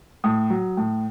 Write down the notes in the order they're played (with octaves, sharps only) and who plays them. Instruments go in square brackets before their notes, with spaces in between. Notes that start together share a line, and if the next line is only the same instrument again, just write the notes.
[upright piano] A2 D#6
F#3
A2